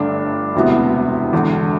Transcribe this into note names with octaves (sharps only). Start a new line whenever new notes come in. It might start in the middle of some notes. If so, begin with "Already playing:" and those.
Already playing: G1 G2 D3 A3 D4
E1 D2 C3 E3 B3
E1 E2 D3